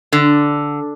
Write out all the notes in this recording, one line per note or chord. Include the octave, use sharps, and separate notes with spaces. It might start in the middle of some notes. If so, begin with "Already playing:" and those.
D3